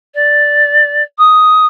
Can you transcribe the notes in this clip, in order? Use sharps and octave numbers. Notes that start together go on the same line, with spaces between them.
D5
D#6